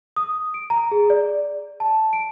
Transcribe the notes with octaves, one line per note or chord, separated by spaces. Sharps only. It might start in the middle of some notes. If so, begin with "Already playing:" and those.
D#6
D7
A#5
G#4
D5
A5
D7